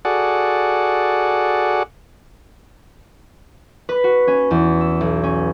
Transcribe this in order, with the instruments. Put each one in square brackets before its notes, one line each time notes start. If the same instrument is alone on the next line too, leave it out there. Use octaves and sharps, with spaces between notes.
[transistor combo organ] F#4 G#4 A4 D5 F#5
[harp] B4
F#4
C#4
E2
E6
B1
C#4